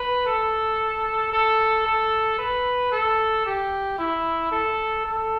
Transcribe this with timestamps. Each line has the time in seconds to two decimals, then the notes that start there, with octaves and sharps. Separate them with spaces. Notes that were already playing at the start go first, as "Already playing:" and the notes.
Already playing: B4
0.27 A4
1.33 A4
1.86 A4
2.39 B4
2.92 A4
3.46 G4
3.99 E4
4.52 A4
5.05 A4